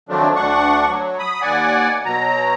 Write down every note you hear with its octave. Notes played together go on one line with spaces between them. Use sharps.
D#3 F3 F#3 A3 C4 D4
D2 D4 F#5 C#6
F#3
B5 D#6
D#2 D5 F#5 G#5
B2 F#3 A#5